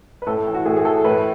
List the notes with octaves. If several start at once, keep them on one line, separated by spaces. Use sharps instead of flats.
B4
A2 A4
E3
F#4
A2 G#4
G#4
E3 A4
A2 B4